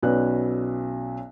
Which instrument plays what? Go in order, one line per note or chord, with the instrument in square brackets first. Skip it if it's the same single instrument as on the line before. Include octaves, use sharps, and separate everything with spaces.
[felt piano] B1 F#3 C#4 B4 D5 F#6